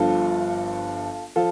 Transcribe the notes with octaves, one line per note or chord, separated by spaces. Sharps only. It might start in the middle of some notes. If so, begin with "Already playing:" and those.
Already playing: G1 G2 F3 F4 A4
F3 F4 A4